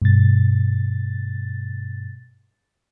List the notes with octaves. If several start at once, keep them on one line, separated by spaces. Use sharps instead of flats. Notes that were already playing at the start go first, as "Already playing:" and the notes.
G2 B2 A6